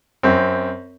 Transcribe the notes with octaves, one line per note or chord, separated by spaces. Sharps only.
F#2 C4